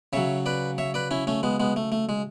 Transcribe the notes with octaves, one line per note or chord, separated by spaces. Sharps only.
C#3 F#3 C#5 E5
B4 D5
C#5 E5
B4 D5
C#4 E4
A3 C#4
G#3 B3
G#3 B3
A3
A3
G#3